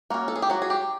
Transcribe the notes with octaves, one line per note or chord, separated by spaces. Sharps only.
A#3 C#4 F#4
A4
G#4
G4
F#3 F#4
G#4
G4